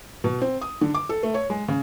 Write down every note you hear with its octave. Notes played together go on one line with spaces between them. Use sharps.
B2
C4
D#6
D3
D6
A4
A3
C#5
G#3
C#3